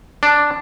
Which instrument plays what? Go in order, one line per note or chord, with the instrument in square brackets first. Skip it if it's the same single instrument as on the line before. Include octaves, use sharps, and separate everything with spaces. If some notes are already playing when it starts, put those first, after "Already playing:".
[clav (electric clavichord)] D4